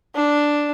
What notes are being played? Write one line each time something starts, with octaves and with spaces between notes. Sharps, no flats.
D4